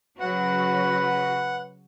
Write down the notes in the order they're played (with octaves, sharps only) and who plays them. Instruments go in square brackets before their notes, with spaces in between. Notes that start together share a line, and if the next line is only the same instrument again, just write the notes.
[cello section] C#3 F#3 F#4 [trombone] B4 [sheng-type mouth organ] F#5